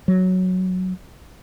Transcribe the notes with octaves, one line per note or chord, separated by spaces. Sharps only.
F#3